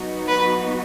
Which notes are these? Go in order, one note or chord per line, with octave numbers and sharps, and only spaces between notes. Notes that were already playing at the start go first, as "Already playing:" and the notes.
Already playing: F#3 B3 D#4 F#4
B4